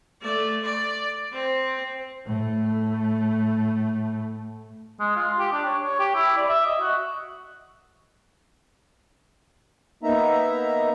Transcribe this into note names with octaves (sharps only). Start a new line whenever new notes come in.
A3 D5
D5
C4
A2 A3
G#3
F4
G4
D4
C#5
C#5
G4
E4
D5
E5
D#5
F#4
A#3 B3 D#4 E5 A#5